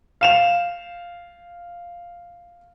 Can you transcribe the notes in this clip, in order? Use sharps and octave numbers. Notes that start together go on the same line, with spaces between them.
F5 E7 F7